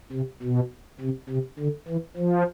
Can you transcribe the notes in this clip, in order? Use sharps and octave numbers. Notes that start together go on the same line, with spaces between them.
C3
B2
C3
C3
D3
E3
F3